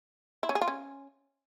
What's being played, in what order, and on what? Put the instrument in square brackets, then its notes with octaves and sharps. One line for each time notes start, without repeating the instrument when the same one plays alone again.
[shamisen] E4
C#4
G#4
F4
C#4